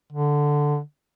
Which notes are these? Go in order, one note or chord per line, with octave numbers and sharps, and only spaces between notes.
D3